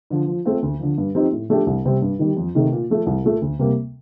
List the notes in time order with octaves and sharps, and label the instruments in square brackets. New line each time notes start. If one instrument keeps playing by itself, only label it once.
[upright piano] D3 F3
F3
A3 C4 F4
D2
D3 F3
G2
F3 C4 D#4 G4
A2
F3 A3 D4 G4
C2
C3 G3 C4
G2
D#3 G3
F2
C3 D#3 A3 D#4
A#2
F3 A3
C2
A#2 A3
D2
C3 G3 A#3